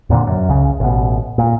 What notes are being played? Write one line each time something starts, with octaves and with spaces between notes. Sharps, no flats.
F2 A#2 D3
F#2
C#2 C#3
A1 B2
A#2